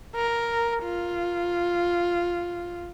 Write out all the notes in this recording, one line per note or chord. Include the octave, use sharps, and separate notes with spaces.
A#4
F4